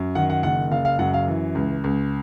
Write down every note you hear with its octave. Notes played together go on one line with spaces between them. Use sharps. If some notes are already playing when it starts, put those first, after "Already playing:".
Already playing: F#2
D#3 F#5
F#5
F#1 F#5
F#1 F5
F5
F#2 F#5
F5
E3
C#2
C#2